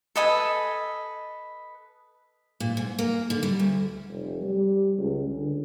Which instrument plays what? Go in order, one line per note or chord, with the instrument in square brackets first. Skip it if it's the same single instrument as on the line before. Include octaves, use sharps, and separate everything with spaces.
[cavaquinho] A4 B4 D#5 G#5
[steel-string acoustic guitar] A#2
G#2
A#3
D3
G3
D2
[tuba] F1
G3
C#2
D3